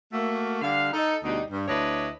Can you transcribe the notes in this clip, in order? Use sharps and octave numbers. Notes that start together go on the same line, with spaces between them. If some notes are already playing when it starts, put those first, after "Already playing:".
A3 A#3 F#4
D3 G3 D4 F5
D#4 A4
D2 B2 G3 D#4
G2
D2 D4 E4 B4 C#5 D#5